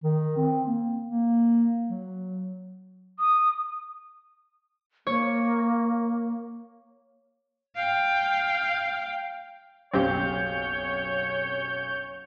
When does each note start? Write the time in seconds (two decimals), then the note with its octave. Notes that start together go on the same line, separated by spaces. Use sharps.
0.04 D#3
0.37 C4
0.67 A#3
1.05 A#3
1.89 F#3
3.19 D#6
5.07 A#3 C#5
7.75 F5 G5
9.94 F#1 B1 C4 C#4 G4 C#5 F5 G6